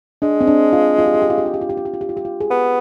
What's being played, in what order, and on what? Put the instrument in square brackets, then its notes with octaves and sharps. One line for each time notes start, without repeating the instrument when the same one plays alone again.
[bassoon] G#3 [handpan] D4
[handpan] C4
D4
F4
F4
G4
F4
G4
F4
G4
F4
G4
F4
G4
F4
G4
F4
G4
F4
G4
F4
G#4
[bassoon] B3 [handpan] G4